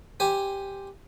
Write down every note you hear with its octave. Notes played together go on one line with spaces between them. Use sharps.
G4 C5 G#5